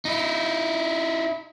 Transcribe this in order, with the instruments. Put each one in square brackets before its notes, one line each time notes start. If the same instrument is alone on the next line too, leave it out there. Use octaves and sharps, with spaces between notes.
[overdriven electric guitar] D#4 E4